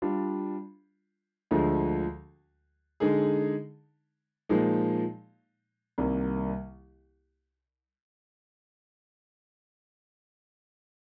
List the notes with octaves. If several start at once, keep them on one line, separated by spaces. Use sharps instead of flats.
G3 D4 F4
D2 D3 F3 G#3
D3 G#3 D#4 G#4
A#2 F3 G#3 D#4
C2 C3 D#3 A#3